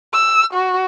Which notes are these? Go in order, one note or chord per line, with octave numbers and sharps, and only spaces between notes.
E6
F#4